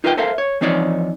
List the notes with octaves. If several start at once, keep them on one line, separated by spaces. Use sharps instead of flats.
D#4 F4 A#4 B4 E5 G5
A4 A#4 C5 E5 F5
C#5
E3 F3 C4 D#4 C#5 D5